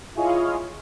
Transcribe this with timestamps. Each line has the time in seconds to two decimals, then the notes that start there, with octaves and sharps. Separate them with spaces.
0.15 E4 F4 G#4 C#5 D#5 F5